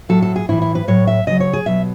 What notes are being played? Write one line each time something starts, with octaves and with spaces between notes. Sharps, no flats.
A2 F#3 A4
A4
G#4
A2 E3 E4
E4
B4
A2 F#3 C#5
E5
C#3 F#3 D#5
C#5
G#4
B2 F#3 E5